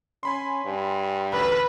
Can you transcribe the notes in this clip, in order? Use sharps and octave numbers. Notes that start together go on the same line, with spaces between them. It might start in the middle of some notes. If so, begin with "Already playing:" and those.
C#4 G#5 B5 C6
G2
A1 D2 B4